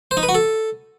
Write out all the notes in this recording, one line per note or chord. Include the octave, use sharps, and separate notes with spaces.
C5
D#4
B4
F#4
A4